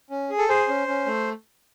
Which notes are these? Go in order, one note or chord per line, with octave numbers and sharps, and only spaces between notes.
C#4
G#4
A4
G#4 C5
C#4
C#4
A3